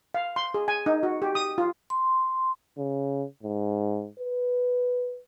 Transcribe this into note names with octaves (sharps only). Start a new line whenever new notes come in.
F5
C6
G#4
G#5
D#4
F#4
G4
D#6
F4
C6
C#3
G#2
B4